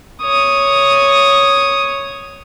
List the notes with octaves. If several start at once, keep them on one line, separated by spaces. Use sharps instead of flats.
C#5 D#6